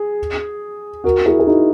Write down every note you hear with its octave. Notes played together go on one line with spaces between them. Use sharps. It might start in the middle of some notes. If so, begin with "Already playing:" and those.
Already playing: G#4
F#4 A#4
E4 G#4
G#4
D#4 F#4